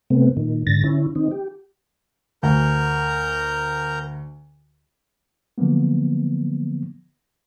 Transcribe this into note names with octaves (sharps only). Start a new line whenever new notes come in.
C3 A3 B3 C4
A#2 D#3
G#2 D3 A6 A#6
D3 C#4 E4
D#3 C4 D#4
G4
D2 A#4 A#5 G6
D3 F3 F#3 A#3 B3